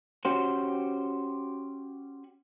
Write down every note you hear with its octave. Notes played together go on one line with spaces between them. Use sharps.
C#4 F#4 G4 C5